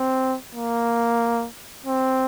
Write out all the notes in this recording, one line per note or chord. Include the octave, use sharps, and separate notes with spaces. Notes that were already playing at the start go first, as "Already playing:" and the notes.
Already playing: C4
A#3
C4